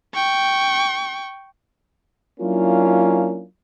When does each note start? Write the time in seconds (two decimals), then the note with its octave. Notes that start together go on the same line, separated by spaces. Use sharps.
0.15 G5 C#6
2.41 F#3 A#3 C#4 D4 E4 F4